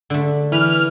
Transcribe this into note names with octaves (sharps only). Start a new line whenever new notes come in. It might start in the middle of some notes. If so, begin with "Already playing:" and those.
D3 A3
E3 B4 F6